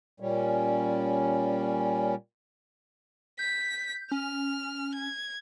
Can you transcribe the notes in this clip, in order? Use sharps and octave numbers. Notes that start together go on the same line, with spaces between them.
A#2 G3 C#4
G6 B6
C#4 F6
G#6